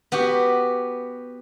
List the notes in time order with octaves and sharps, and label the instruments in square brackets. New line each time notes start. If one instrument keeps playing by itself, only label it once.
[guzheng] B3 F#4 G4